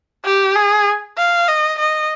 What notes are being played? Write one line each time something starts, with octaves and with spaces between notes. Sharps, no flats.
G4
G#4
F5
D#5
D#5